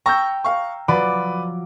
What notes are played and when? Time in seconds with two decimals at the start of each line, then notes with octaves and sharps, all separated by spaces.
0.06 G5 A#5 C#6 E6 G6
0.44 F5 C#6
0.88 F3 F#3 B4 D5 D6